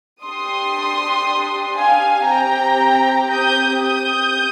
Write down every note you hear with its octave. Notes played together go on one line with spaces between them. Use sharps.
D4 G4 C6 D#6
F5 G#5
C4 G4 G5 A#5
D#6 G6
D#6 G6